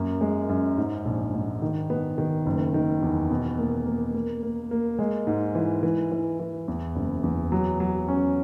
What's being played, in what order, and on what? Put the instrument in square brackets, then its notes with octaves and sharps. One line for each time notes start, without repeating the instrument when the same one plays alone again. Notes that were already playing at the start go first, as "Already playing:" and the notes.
Already playing: [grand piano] F#2 A#3
G#3
F#2
G#2
A#1
G#2
D#3
B3
D#3
F#1
D#3
E2
B2
A#3
A#3
A#3
A#3
A#3
G#3
G#2
E3
E3
E3
E3
E2
F#1
E2
F#3
F#3
C#4